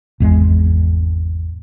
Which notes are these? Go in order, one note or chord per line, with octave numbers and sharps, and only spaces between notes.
G#1 E2 G#3